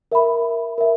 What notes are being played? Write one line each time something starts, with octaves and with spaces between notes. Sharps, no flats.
A#4 E5 B5
A#4 E5